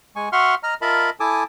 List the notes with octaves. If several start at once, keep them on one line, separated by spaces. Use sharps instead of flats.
G#3 G#5 C#6
F#4 E5 F#5 C6 C#6 F6
D#5 A#5 F6
F4 A#4 D#5 E5 A5 B5
E4 A4 G#5 A5 D6 D#6